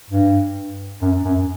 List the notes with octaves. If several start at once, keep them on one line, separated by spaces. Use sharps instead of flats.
G2
F#2
F#2